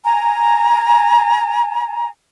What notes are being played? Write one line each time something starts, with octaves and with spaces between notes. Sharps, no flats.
G#5 A#5